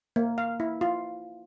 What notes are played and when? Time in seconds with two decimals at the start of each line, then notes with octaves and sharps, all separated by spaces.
0.16 A#3
0.38 F5
0.60 E4
0.81 F4